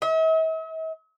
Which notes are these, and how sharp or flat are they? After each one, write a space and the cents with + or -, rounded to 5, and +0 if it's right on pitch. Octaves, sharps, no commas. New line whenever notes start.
E5 -45